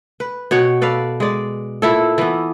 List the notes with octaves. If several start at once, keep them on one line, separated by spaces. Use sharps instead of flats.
B4
B2 C#5 F#5 G5
A4 B4 D5 F5
G#3 D5
A#2 E4 A4
E3 B3